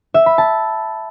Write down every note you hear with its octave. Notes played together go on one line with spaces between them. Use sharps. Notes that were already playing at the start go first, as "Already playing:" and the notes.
E5
B5
A5